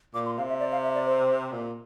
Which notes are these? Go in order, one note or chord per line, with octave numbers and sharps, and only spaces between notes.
A#2 D6
C6
C3 F5
E5
D5
F5
E5
D5
C5
A#2